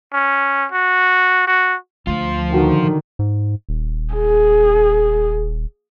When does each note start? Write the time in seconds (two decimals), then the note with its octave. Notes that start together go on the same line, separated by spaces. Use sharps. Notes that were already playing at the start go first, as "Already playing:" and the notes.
0.13 C#4
0.72 F#4
1.47 F#4
2.07 D2 F3 F4
2.53 D3 D#3 F#4 G5
3.19 G#2
3.69 D#1
4.14 G#4